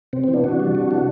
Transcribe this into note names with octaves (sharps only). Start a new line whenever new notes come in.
C3 C4
E3 C4
B3 D4
C3 D4 F#4
G3
C3
E3